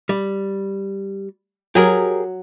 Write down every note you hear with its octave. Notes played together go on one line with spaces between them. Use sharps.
G3
F#3 G4 G#4 A#4